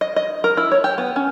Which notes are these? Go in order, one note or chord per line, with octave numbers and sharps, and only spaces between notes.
D#5
D#5
A#4
E4
C#5
G4
B3
C#4